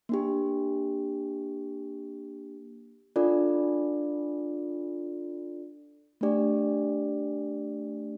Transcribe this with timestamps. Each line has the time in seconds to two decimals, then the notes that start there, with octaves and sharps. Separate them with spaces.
0.09 A#3 D4 G4
3.16 D4 F4 A4 D5
6.21 A3 D4 G4 D5